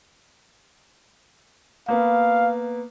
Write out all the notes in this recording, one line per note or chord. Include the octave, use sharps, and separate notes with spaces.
A#3 B3 F5